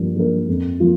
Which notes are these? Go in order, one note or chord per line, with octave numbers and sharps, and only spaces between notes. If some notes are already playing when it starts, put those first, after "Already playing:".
Already playing: G2 F3 A#3 D4
F3 A#3 D4 A#4
F2
F3 A#3 F4